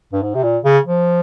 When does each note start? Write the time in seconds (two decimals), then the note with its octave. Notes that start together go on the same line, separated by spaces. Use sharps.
0.13 G2
0.23 G#2
0.35 C3
0.43 A#2
0.64 C#3
0.85 F3